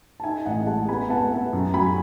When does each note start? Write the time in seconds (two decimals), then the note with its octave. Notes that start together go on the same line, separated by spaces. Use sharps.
0.20 A5
0.24 D#4 E5 G#5
0.46 A1 D#5 F#5
0.67 G#3 F#5 A5
0.88 B3 G#5 B5
1.10 B3 F#5 A5
1.32 B3 E5 G#5
1.53 F#2
1.74 F#3 G#5 B5